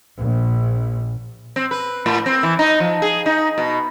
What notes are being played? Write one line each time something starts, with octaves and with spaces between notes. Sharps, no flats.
A#1
C4
B4
A2
C4
E3
D#4
F3
G#4
D#4
B2